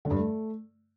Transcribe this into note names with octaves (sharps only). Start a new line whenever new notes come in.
D3
G2
A3